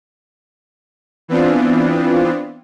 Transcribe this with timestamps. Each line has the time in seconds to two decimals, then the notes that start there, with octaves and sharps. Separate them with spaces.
1.28 E3 B3 C4 D4 F4